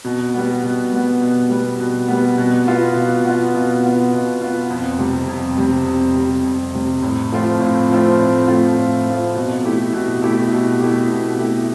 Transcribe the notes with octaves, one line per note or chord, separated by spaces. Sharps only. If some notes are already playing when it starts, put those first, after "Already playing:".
B2
G3 B3
B2
G3 B3
B2
G3 B3
B2
G3 B3
B2
B3 F4
B2
B3 F4
B2
B3 F4
B2
B3 F4
F2
C3 G3
F2
C3 G3
F2
C3 G3
F2
C3 G3
A2
F3 A3 C4 F4
A2
F3 A3 C4 F4
A2
F3 A3 C4 F4
A2
F3 A3 C4 F4
B2
A3 E4 G4
B2
A3 E4 G4
B2
A3 E4 G4
B2
A3 E4 G4